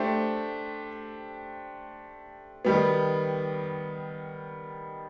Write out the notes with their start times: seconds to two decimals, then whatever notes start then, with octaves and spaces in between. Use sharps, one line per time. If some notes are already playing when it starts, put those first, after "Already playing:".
Already playing: A3 D4 G4 C5
2.65 D#3 G3 B3